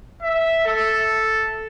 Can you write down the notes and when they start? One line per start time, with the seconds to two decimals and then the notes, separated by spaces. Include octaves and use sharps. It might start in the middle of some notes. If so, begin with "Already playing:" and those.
0.22 E5
0.66 A4